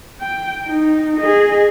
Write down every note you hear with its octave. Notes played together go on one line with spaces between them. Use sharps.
G5
D#4
G#4 D#5